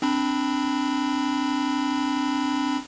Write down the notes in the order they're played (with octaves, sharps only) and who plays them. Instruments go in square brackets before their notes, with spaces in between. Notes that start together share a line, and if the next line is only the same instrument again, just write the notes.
[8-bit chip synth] C4 D4 B5